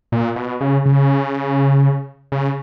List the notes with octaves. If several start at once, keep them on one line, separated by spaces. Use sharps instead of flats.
A#2
B2
C#3
C#3
C#3